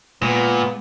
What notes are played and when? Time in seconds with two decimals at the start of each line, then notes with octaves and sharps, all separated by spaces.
0.22 A#2 G#3 B3